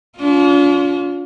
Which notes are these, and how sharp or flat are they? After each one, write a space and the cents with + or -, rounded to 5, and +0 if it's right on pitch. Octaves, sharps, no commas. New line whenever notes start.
D4 -45 F4 +20